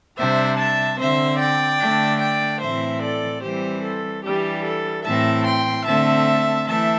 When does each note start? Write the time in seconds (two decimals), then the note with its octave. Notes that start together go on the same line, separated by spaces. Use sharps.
0.18 C3 G3 D4 C5 E5
0.58 E5 A5
0.99 D3 C4 C5 E5
1.39 D5 G5
1.80 D3 A3 D4
2.21 D5 G5
2.61 A2 E3 C4 C5 E5
3.02 A4 D5
3.43 E3 G3 C4 G4 C5
3.83 A4
4.24 E3 G3 D4 G4
4.65 A4
5.06 A2 E3 C4 E5 A5
5.46 G5 C6
5.87 D3 A3 C4 E5 A5
6.68 E3 A3 E5 A5